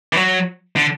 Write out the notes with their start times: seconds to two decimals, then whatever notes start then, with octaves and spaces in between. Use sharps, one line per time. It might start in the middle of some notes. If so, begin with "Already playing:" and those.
0.13 E3
0.17 F#3
0.76 D3